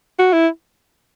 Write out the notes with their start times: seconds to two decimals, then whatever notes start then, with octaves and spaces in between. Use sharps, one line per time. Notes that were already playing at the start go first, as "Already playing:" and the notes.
0.19 F#4
0.33 E4